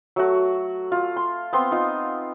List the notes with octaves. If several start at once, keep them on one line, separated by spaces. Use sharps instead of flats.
F#3 A3 F#4
F4
C6
B3 C4 C6
D#4 F4